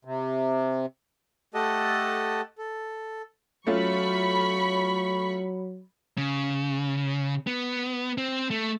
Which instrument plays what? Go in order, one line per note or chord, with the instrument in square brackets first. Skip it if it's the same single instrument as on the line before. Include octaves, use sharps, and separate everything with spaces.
[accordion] C3
[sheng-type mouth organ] A3 G4 A4 D#5 F#5 A5
A4
[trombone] F#3 [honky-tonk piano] A3 C#4 F4 [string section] B5 C#6
[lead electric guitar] C#3
B3
C4
A3